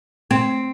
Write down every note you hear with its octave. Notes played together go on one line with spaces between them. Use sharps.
C4